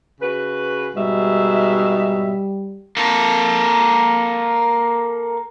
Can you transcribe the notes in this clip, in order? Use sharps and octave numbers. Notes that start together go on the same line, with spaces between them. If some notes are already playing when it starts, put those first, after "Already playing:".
C#3 F#4 B4
G#2 B2 G3 E5
A#3 A4